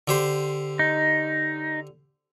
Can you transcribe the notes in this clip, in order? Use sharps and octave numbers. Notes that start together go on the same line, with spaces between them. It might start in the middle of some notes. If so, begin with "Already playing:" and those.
D3 G4 C5
D#4